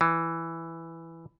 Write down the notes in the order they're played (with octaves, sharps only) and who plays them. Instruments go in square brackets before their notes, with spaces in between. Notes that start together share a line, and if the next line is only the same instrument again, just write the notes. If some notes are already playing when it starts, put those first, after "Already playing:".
[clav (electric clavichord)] E3